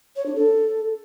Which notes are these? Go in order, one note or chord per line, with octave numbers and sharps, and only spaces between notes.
C#5
D4
A4